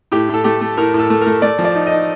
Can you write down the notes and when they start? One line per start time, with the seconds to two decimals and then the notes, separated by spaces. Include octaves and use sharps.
0.12 A2 G4
0.29 A2 A4
0.44 A3 G4
0.61 A3
0.77 A2 A#4
0.94 A2
0.99 A4
1.10 A3
1.21 A#4
1.26 A3
1.42 A3 D5
1.59 F3
1.65 D5
1.75 D#4
1.87 D#5
1.92 D#4